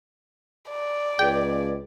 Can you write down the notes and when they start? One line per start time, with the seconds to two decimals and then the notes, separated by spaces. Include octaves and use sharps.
0.70 D5
1.19 C#2 G#4 B4 G5